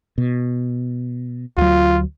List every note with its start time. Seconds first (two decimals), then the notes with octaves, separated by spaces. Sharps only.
0.18 B2
1.57 D2 F#3 F4